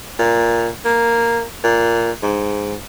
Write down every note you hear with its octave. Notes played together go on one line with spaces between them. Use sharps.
A#2
A#3
A#2
G#2